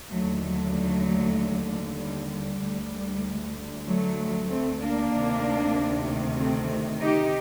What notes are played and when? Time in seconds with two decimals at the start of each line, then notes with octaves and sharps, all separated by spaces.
0.10 D#2 D3 F#3 A3
0.42 F#3 A3
1.98 G3
2.31 G3
2.62 D2 D3
3.87 F#3 A3
4.50 A3 C4
4.81 A#3 D4
5.12 D2 C3 D#3
6.38 A3 C4
7.01 D#4 G4